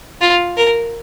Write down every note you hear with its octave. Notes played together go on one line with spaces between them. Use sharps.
F4
A#4